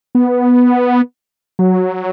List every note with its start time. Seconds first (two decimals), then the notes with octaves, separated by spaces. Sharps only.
0.15 B3
1.59 F#3